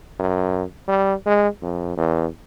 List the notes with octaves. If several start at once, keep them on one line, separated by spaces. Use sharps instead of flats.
F#2
G3
G#3
F2
E2